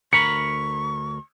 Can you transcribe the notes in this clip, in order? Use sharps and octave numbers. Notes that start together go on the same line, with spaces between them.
D2 A#4 B5 C#6 C#7